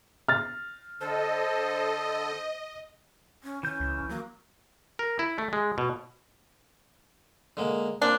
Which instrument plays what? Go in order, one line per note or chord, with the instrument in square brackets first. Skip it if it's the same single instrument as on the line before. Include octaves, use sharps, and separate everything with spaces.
[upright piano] F6 A6
[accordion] D3 A4 [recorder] C5 [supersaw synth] D#5
[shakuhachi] C#4
[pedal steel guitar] E3 G6 [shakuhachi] C#4
[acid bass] C#2
[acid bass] F#3 [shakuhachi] A#3
[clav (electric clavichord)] A#4
E4
A3
G#3
B2
[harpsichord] D3 G#3 A#3
[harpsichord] A#3 C4 F4 [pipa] D4